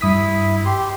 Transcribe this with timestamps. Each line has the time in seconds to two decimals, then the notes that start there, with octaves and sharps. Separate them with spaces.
0.01 G2 E4 D#6 B6
0.65 G4 C6